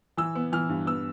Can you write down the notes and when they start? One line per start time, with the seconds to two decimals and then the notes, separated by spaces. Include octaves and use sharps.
0.17 E3 E6
0.35 B3
0.53 E3 F6
0.69 G2
0.87 B3 E6